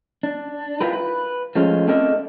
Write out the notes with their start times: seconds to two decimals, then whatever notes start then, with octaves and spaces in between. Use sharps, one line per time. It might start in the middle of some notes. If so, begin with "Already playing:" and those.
0.23 D4
0.81 E4 F4 G4 A#4 B4
0.93 B4
1.55 F3 G#3 A3 C#4 F4
1.87 A3 C4 D4 A4 A#4 D#5